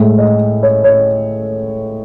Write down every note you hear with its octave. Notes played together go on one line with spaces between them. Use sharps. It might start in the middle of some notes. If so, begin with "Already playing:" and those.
Already playing: A2 G#3 E5
D#5
C#5
C#5